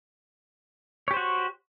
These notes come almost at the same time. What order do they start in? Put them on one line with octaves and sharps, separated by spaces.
C#5 G4 C5 F#4